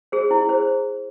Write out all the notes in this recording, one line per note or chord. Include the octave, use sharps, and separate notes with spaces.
G#4 C5
E4
G#4 C5